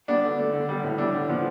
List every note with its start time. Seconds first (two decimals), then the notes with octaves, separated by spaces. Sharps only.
0.08 G3 B3 D4
0.24 D3
0.39 A3
0.53 D3
0.69 G3 B3
0.83 A2
0.98 E3 G3 D4
1.14 D3
1.29 F3 B3